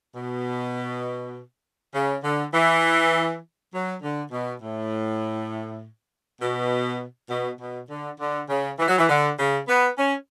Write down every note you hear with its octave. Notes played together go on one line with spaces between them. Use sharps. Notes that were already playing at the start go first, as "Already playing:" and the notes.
B2
C#3
D3
E3
F#3
D3
B2
A2
B2
B2
B2
D3
D3
C#3
E3
F#3
E3
D3
C#3
B3
C#4